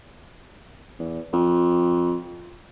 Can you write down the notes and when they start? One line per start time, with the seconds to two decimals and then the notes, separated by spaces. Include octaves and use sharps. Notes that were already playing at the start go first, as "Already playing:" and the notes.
0.99 E2
1.33 F2